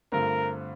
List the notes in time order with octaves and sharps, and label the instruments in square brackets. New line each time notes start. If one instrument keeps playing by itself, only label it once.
[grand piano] G2 D3 A3 C4 F4 [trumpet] A#4